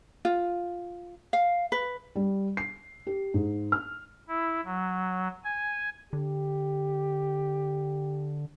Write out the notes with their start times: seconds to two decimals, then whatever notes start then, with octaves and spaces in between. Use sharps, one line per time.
0.25 F4
1.33 F5
1.72 B4
2.16 G3
2.57 C7
3.07 G4
3.34 G#2
3.72 F6
4.28 E4
4.65 F#3
5.44 G#5
6.13 D3 G4